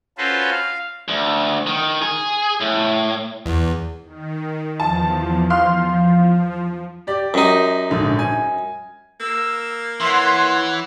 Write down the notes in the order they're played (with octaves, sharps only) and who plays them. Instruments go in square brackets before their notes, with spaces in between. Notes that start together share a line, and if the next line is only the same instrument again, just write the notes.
[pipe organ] C#4 F4 F#4 A4 B4 C5
F5
[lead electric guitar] D2
D#3
G#4
A2
[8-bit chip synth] E2
[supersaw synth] D#3
[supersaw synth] E2 F3 [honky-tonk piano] A5
[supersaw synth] F3 [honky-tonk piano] F5 C6 F6
[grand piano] G4 D5
[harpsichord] F#2 D#4
[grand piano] A#1 G#2 D3
G#5
[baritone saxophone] A#3 [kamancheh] E6
[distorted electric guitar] E3 [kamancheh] C#5 F#5 [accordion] C6